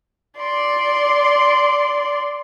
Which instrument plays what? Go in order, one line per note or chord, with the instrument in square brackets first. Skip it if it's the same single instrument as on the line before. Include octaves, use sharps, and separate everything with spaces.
[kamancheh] D5 C6